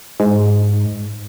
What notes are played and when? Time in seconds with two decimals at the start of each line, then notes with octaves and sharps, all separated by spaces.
0.20 G#2